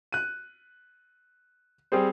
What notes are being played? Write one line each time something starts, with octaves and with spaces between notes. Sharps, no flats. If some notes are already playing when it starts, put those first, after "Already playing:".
F#6 D#7
G3 C4 G4 G#4 C5